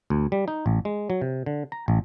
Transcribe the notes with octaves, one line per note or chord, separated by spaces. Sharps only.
D2
G3
D#4
A1
G#3
F#3
C3
D3
A#5
A1